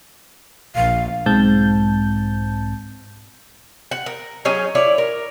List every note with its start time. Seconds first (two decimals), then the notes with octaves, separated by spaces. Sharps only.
0.76 A#1 F5
1.26 B1 G#2 C4 A5 G6
3.91 F#5
4.06 A#4
4.45 F#3 C#4 D#4 G#4
4.75 E4 C#5 D5
4.98 A#4